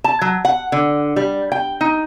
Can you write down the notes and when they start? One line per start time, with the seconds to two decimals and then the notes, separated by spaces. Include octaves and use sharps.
0.04 A5
0.22 F#3
0.45 F#5
0.72 D3
1.16 G3
1.52 G5
1.81 D#4